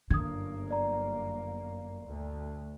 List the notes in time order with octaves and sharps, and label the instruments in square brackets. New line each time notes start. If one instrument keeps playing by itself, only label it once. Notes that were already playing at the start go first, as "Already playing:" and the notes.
[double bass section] G1 F#2 A#3 [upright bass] D3 [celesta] D#6 G#6
[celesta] D5 A#5
[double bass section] D2